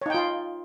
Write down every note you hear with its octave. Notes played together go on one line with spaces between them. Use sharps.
D#4 F4 C#5 G5